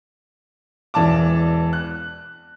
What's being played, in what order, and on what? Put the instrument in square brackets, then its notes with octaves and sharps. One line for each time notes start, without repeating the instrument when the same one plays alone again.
[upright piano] E1 E3 D5 A5 D6
F#6